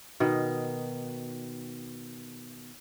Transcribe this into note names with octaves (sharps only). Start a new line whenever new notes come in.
B2 D#3